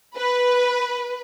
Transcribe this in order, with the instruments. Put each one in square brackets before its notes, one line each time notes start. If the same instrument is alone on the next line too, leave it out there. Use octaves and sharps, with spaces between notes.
[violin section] B4